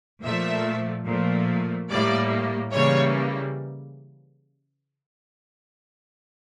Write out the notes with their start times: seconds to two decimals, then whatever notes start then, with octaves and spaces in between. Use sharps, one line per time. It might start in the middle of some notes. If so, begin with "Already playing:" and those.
0.22 A#2 F3 A3 E5
1.05 A#2 F3 A3
1.90 A2 G3 A#3 D5
2.72 C#3 E3 G3 A#3 C#5